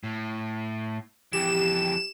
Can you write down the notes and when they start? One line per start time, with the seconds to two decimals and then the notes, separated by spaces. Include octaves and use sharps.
0.03 A2
1.33 F2 E3 G4 E7